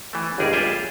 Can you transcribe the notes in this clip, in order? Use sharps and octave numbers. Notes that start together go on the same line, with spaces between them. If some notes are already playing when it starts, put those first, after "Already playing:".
E3 A3
G1 C#2 G3 G#4 A#4 D5
F4 G#4 E5 G5